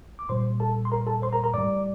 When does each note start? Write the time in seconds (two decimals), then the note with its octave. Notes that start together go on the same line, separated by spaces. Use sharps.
0.19 D6
0.29 A#2 G3 C5 C6
0.60 A4 A5
0.85 C6
0.92 A#4 A#5
1.07 A4 A5
1.22 C5 C6
1.33 A#4 A#5
1.44 A#4 A#5
1.54 A2 G3 D5 D6